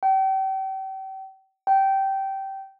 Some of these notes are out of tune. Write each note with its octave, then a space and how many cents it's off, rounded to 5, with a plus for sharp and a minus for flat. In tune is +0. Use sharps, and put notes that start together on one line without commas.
G5 -35
G5 -15